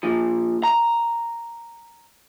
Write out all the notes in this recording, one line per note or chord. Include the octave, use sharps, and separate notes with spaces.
A#2 F3
A#5